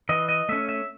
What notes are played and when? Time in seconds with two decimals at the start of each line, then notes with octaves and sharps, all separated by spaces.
0.09 E3 D#5
0.29 D#5
0.49 A3 C#4 E5
0.69 E5